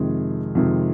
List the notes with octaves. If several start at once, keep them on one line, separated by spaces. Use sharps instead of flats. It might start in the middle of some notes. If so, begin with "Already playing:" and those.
Already playing: F2 C3 D#3 G#3
F2 C3 D#3 G#3